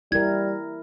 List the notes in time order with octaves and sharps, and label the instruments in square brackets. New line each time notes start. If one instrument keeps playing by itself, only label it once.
[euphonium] G3 [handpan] E4 A#4 [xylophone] G#6